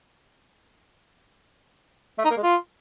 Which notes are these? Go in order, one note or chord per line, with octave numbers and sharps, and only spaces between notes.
A3
D#4
A#3
G#3
F4